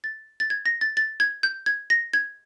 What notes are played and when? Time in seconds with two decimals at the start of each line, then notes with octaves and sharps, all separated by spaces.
0.04 A6
0.40 A6
0.50 G#6
0.66 A#6
0.81 A6
0.97 A6
1.20 G#6
1.43 G6
1.66 G#6
1.90 A#6
2.13 G#6